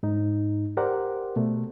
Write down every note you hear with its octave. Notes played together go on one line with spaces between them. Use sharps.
G#2 D#4
G4 A#4 C5 D5 F#5
B2 A3